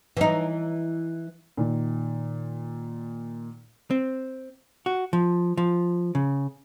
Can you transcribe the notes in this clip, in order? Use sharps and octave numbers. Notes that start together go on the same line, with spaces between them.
E3 D#4
A#2 D#3
C4
F#4
F3
F3
C#3